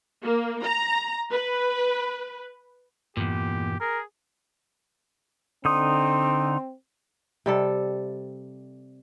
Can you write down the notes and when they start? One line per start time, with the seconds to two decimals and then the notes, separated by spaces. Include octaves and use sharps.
0.23 A#3
0.64 A#5
1.31 B4
3.17 E2 G2 A#2 G4
3.80 G#4 A#4
5.65 D3 C4 D#4 C6 D#6
7.46 C3 G3 A4